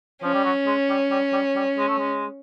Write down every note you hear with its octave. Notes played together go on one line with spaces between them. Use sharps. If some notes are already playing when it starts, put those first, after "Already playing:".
F3 C#4
G3
F#3
G#3
G3
G3
G3
G3
G#3
A3
G#3